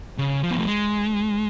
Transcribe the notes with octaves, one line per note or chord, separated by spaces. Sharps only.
C#3
F3
B3
A3
G#3